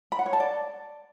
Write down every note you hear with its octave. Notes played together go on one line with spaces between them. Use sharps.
B5
F#5
C#5
A5
D5